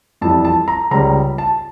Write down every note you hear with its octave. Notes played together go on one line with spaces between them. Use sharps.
F2 E3 G3 A5
A5
A#5
C#2 C#3 G3 A#5
A5